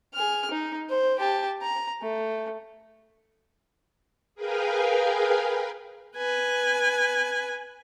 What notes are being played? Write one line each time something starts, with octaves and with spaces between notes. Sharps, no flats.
G#4 F6
D#4
C5
G4 A5
A#5
A3
G#4 A#4 B4 F5 G5 G#5
B4 G#5